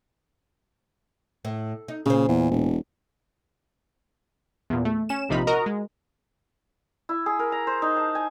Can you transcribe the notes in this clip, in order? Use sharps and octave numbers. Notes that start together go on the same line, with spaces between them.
A2
D#4
A#2 C#3 C5
E2
E1
E2 A#2
A3
C#4 E7
A#1 C3 F3 D#4 B5
F#4 A#4 D#5 A#5
G#3
E4
G#4
A#4
A#5
C5
D#4
A5
G#5